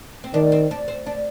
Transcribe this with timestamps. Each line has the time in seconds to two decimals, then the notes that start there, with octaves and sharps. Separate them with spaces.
0.24 C4
0.34 D#3 D4
0.52 C4
0.71 D4
0.88 C4
1.06 D4